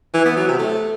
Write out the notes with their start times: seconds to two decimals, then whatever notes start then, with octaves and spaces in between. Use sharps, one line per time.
0.14 E3
0.25 B3
0.37 F#3
0.48 C3
0.59 A3